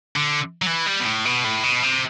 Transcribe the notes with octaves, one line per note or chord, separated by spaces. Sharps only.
D3
F#3
E3
G3
B2
A2
B2
A2
B2
C3